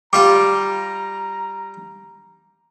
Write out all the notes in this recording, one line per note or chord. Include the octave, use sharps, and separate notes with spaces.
G3 F4 G4 A#5 D6